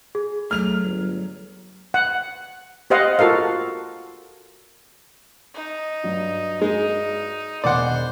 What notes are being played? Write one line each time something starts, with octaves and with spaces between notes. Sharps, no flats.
G#4
F#3 A3 F6 F7
G1
F#5
G4 C5 D#5 F5 F#5
F4 F#4 A4 A#4 F5
D#4
G2 F#3
G#3 D#4
E1 D#3 C5 D5 F#5 G#5